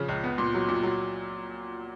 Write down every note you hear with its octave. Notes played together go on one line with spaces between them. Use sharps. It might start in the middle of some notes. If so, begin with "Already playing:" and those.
Already playing: C#3 F3
C#2
B3
A#2
F#3
A#2
F#3